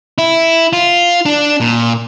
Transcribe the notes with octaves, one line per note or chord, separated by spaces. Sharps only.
E4
F4
D4
A#2